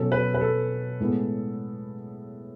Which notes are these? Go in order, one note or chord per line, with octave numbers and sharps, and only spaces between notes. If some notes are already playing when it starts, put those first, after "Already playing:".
Already playing: B2 F#3 C#4 A4
B4
B4
A4
A2 G#3 B3